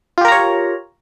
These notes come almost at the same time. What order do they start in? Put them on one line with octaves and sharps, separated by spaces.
F4 G4 A#4 A#5 C#5